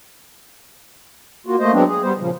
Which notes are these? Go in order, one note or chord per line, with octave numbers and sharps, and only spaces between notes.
A#3 F4 F#4
A3 A#3 C5 D#5
F#3 G#3 B3 C4 D4
G#4
G3 B3 C5
A#2 C#3 F3